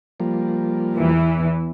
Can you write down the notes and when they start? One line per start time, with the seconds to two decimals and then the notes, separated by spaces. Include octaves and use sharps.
0.20 F3 G3 A#3
0.95 E2 E3